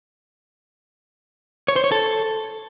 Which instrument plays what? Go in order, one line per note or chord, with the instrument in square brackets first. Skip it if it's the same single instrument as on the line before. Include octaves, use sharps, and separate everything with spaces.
[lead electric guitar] C#5
C5
C#5
A4